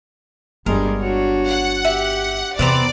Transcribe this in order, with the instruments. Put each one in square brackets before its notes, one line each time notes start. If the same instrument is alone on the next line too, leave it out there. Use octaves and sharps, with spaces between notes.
[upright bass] G1 [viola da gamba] G2 G3 G#3 [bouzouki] A#4
[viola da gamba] D4 F#4 C#5
[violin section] F#5
[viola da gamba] G4 [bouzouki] E5
[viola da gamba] E2 [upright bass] C3 [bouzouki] B3 C4 A#5 [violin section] D5